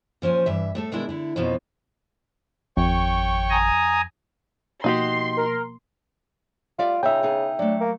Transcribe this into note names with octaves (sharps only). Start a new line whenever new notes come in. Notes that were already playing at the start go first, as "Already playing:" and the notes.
A#2 F3 C#4 C5 C#5
G2 E3 E5
A2 A3 A4
B2 D#3 G#3 D4 E4 A#4
D3 E4
F2 B2 F3 C#4 D#4
G#1 F2 C#5 G5 C#6
G#5 A#5 D#6
B2 F3 A#3 D#4 F#4 G4 C6
A#4
G3 F4 D5 E5
C#3 D#4 F4 G#4 E5 G5
B3 D#4 G#4
F#3 A3 D4
A#3